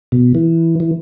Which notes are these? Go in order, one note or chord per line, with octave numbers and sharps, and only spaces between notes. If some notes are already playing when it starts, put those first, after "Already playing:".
B2
E3
E3